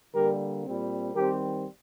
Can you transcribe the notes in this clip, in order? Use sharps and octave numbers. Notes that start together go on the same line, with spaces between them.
D3 G3 A#3 G4 A#4
A#2 G3 C4
D#3 G3 C4 G4 A#4